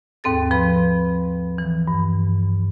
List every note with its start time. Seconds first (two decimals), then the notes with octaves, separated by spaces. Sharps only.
0.24 D#2 G#2 C4 A4 A6
0.51 F3 B4 B5
1.58 E3
1.88 G2